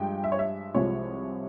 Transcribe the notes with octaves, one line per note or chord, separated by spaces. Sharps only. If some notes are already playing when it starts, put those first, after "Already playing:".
Already playing: G2 F3 G#3 G5
E5
C#5
E5
C2 C3 F3 G#3 C#5